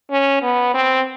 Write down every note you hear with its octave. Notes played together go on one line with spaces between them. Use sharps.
C#4
B3
C4